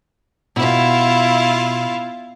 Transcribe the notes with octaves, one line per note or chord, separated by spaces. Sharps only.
B2 E4 F4